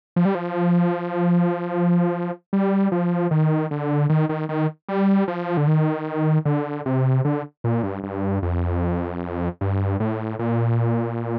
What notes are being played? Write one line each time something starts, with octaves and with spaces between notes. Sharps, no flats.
F3
G3
F3
G3
F3
D#3
D3
D#3
D#3
D#3
G3
F3
D3
D#3
D3
C3
D3
A#2
G2
G2
F2
G2
A2
A#2